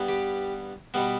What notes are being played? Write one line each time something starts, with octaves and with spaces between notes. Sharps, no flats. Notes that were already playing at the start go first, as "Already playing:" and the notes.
Already playing: G2 G3 B3
G4
B2 G3 B3